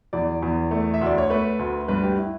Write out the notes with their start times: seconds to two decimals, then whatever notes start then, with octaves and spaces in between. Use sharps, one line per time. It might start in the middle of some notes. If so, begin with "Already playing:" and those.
0.13 E2 D5
0.42 E2
0.71 A3
0.94 E5
1.01 D2 D5
1.18 C#5
1.30 A3 B4
1.59 D2
1.88 G2 B4
2.03 G4
2.18 E4